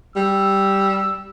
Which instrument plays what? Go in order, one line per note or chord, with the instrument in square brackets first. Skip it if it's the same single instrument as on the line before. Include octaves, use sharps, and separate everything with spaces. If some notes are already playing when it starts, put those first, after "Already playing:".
[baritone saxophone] G3 [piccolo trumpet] E6